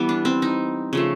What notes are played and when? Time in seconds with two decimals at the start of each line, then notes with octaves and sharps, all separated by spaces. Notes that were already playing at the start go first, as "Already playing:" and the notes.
Already playing: E3 G3 B3
0.09 D4
0.25 C4
0.42 D#4
0.93 C#3 F3 A3